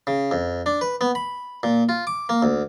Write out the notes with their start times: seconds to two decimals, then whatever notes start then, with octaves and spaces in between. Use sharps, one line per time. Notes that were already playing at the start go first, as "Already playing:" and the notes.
0.07 C#3
0.31 F2
0.66 D4
0.81 B4
1.01 B3
1.15 B5
1.63 A#2
1.89 F4
2.07 D6
2.29 A#3
2.42 D2